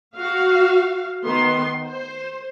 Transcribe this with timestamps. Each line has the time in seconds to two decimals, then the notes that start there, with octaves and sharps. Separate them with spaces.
0.17 F#4 F5
1.25 D#3 B3 C6
1.84 C5